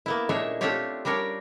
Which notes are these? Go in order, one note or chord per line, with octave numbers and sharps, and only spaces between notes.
A#3 B3 E4
A#2 G#3 A3 D4 C#5 E5
A3 C4 D4 F4 G4 C#5
G3 D4 A#4 C#5 D5